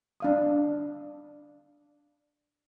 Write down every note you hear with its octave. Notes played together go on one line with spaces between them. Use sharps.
D4 F5 D#6